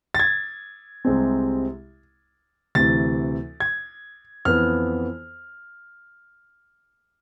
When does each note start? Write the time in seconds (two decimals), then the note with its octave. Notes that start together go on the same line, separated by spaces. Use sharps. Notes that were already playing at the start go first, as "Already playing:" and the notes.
0.15 A6
0.19 G#6
1.05 C2 C3 G#3 C4
2.75 D2 C3 E3 A6
3.60 G#6
4.45 F2 E3 B3 F6